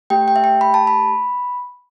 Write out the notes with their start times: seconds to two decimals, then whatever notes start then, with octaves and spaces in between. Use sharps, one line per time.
0.10 A3 G4 G5
0.28 G5
0.36 E5
0.44 G5
0.61 B5
0.74 A5
0.87 B5